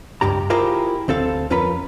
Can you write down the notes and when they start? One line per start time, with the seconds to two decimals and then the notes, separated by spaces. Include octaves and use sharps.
0.21 C#2 G2 G4 A#5
0.50 E4 F4 G4 G#4 A#4 C5
1.08 D2 C4 A4 F5
1.50 F2 C#4 F4 A#4 B4 B5